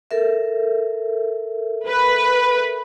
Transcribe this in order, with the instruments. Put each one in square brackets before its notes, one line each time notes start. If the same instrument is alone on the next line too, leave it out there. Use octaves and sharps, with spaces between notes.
[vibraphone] A4 A#4 E5
[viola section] B4